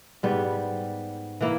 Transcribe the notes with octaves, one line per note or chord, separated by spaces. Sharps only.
G#2 G3 B3
E3 A#3 E4